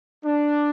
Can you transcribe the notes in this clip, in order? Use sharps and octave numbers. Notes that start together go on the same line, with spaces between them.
D4